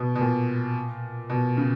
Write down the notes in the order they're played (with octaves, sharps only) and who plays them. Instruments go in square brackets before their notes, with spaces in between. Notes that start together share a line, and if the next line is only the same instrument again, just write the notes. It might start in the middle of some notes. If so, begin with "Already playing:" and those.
Already playing: [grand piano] B2
B2
A#2
B2
C#3